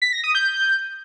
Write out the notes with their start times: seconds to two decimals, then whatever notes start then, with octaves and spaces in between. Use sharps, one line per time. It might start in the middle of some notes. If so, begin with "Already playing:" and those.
0.02 B6
0.13 A#6
0.24 D#6
0.35 G6